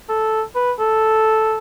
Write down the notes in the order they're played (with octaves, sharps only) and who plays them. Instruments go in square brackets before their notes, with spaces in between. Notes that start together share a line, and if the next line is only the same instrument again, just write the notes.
[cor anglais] A4
B4
A4